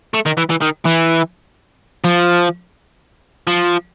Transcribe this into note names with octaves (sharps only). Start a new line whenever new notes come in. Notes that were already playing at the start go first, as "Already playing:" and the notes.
A3
D#3
E3
E3
D#3
E3
F3
F3